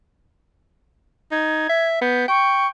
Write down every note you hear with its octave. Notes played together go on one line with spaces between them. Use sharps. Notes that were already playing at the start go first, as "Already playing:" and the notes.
D#4 G#6
E5
B3 G6
G5 C#6